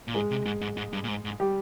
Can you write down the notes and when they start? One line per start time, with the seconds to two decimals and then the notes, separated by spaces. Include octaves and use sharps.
0.08 A#2
0.14 G#2 G#3 G#4
0.31 C3
0.45 G#2
0.61 G#2
0.77 G#2
0.93 G2
1.04 A#2
1.08 G#2
1.25 G#2
1.40 G3 G4